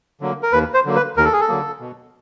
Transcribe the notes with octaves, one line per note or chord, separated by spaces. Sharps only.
D3 F#3 A#3
A#4
D#2 B4
C5
D3 F#3 A#3
B4
D#2 A#4
A4
G#4
A4
D3 F#3 A#3
B2